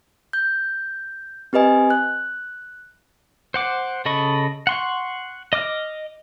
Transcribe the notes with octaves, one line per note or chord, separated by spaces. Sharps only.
G6
C4 G4 B4 D#5 G#5
F#6
C5 F#5 D6
C#3 A4 D#5 B5 C#6
F#5 C6 C#6
D#5 D6 F6